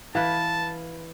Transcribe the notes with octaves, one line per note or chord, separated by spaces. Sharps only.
E3 B4 F5 A5